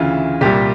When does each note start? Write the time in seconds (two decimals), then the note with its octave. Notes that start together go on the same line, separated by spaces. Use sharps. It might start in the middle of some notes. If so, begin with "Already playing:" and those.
Already playing: D2 C#3 E3 F4
0.41 C2 A#2 G3 G4